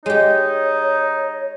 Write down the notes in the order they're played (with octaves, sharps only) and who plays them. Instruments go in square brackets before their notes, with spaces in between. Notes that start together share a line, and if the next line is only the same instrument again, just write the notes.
[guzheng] G#3 G4 [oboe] D#4 [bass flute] C#5